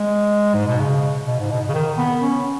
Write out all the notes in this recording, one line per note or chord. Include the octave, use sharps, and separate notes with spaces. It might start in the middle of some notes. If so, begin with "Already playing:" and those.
Already playing: G#3
G#2
B2
C#3
B2
G#2
B2
C#3
D#3
B3
C#4